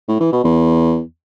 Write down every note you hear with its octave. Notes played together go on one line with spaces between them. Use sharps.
A2
E3
B2
E2